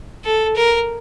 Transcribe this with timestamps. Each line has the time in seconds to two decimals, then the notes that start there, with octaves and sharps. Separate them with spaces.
0.24 A4
0.56 A#4